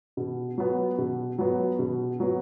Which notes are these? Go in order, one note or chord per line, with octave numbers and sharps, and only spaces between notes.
B2
F#3 B3
B2
F#3 B3
B2
F#3 B3